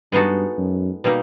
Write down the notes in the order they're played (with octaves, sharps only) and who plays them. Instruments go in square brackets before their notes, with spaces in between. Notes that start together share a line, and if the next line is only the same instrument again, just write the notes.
[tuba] G2 [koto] G#3 B3 D#4 F#4 A4
[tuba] F#2
[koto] B2 G3 A#3 D#4